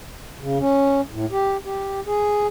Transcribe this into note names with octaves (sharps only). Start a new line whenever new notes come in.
C#3
C#4
A2
G4
G4
G#4